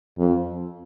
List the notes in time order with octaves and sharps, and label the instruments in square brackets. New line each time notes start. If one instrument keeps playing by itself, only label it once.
[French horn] F2